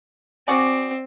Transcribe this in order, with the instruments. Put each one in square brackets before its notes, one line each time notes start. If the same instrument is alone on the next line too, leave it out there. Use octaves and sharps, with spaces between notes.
[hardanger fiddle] C4 [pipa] F#4 G#4 D5